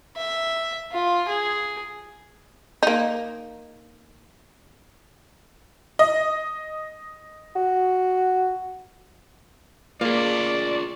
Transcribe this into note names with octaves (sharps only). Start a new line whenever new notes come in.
E5
F4
G#4
A#3 D#4
D#5
F#4
A#3 F4 G#4 D5